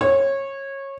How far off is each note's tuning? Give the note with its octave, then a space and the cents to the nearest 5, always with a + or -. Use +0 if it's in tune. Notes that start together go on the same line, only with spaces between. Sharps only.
C#5 -20